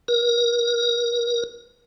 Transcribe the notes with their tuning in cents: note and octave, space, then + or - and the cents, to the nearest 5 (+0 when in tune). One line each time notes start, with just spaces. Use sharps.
A#4 +30